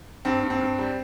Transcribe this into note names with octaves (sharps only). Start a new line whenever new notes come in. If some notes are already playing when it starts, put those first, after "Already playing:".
G2 C4
G2
C4
G2
G3